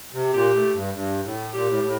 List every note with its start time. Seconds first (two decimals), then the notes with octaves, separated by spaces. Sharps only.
0.13 C3
0.34 A#2 G4
0.54 A2
0.74 G2
0.94 G2
1.24 A2
1.53 A#2 G4
1.69 A2
1.84 A2